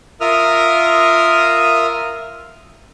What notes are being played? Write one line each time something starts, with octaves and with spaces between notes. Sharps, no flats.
F4 A#4 E5 D#6 F6